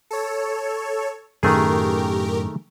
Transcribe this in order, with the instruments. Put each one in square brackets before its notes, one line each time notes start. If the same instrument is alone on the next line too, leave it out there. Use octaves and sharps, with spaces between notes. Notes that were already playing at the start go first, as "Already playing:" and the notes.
[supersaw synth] A4 C#5
[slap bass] F#2 A2 C#4 [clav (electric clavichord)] D#3 A3 G#4 [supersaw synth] G4 A#4